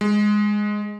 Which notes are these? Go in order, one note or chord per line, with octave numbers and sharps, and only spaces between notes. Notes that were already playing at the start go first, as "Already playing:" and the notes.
G#3